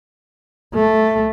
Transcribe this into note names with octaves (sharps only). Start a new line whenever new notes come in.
A3